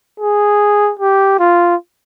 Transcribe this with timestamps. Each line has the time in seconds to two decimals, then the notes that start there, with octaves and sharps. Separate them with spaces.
0.20 G#4
0.99 G4
1.39 F4